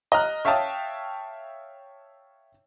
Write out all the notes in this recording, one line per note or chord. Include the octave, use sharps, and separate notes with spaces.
D#5 A#5 F6 F#6
C#5 E5 F5 G5 A5 D#6